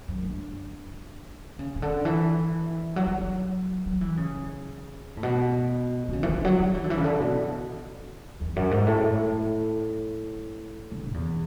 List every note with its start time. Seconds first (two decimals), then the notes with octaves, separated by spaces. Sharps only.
0.08 F#2
0.23 D3
1.59 C#3
1.76 C#3
1.82 D3
2.05 E3
2.96 F#3
3.07 E3
3.18 F#3
3.86 F#3
4.01 E3
4.17 C#3
5.17 A2
5.23 B2
6.08 D3
6.13 C#3
6.23 E3
6.29 D3
6.45 F#3
6.60 F#3
6.75 E3
6.84 D3
6.90 E3
6.97 C#3
7.04 D3
7.20 B2
8.41 E2
8.56 F#2
8.71 G#2
8.87 A2
10.91 D3
11.09 F#2
11.14 E2